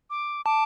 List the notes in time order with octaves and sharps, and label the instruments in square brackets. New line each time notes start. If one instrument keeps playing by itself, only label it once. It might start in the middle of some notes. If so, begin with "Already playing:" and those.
[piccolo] D6
[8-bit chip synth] A5 [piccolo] D6